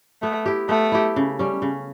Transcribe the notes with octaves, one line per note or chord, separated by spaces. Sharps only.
A3 B3
E4 G4
A3 B3
E4 G4
C#3
G3 C#4
C#3